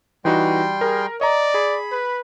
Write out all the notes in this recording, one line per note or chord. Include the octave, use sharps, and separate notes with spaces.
E3 G3 D#4 F#4 G5 C6
G#4 A#4
D5 D#5 A#5
G#4 B5
B4